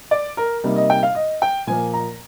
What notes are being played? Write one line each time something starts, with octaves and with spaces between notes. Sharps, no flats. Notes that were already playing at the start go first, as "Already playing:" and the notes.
D5
A#4
C3 G3 A#3 D#4
D#5
G5
F5
D#5
G5
A#2 F3 A#3 G#5
A#5